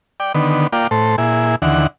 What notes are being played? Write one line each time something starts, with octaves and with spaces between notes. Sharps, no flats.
D5 G5
D3 D#3 B3
A#3 F4 D5 G5
A2 A4 C5
A#2 E4 G#4
D#2 D3 E3 F#5